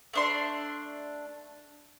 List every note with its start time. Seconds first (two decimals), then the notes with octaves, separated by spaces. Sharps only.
0.13 A3 D4 C6